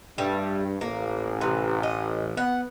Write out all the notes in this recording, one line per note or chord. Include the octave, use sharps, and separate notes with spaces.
G2 G3 A3
A1 A#3
C3 E3
D#5
B3 F#5